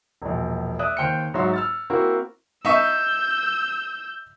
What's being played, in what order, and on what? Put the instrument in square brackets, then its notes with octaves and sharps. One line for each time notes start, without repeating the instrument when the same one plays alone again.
[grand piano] E1 A#1
D5 E5 D#6 F#6
D#2 C5 G5 F6 C#7
G#2 F#3 F#4 E5 C6
E6 F6 A6
A#3 C4 E4 F#4 A#4
[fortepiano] D#4 E5 C#6 [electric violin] E6 G6